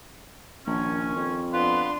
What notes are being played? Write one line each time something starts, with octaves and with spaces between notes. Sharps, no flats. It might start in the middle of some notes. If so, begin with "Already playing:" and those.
A#1 D#3 C#4
F2
B3 D4 F4 B4 C6